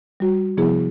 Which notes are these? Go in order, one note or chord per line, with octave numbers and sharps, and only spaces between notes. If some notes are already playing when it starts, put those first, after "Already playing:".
G3 F#4
C3 F3 B3 E4 G#4